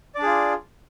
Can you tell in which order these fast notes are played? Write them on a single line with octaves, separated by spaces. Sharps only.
D5 D4 G#4 F4